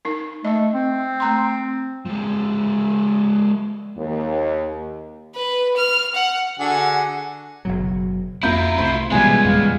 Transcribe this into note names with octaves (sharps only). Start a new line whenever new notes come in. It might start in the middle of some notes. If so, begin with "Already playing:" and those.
D#4 A#4
A3 D#5
C4
A3 A#5 C6
F3 G#3
D#2
B4
F6
F#5
D3 F#4 G#4
F#1 B2 F#3
F2 A#3 C4 E4 F4 A#5 B5 G6
C2 A3 C4 C5 B5
B2 E3 G3 G#3 B3 F4 G#5
E2 A#2 E3 F5